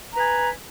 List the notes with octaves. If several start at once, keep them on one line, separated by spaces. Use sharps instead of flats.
B4 G#5 A#5